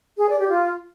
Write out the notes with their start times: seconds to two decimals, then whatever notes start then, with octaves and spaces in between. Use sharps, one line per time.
0.18 G#4
0.29 D5
0.39 G4
0.50 F4